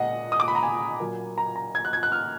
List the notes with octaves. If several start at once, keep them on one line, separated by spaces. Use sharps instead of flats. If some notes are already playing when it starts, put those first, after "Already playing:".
Already playing: A#2 G#3 D#5 F#5
D#6
D6
B5
A#5
G#5
A#2 F#3 A#3
A#5
A#5
G#6
F#6
G#6
F#6
F6